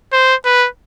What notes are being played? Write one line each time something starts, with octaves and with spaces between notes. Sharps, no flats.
C5
B4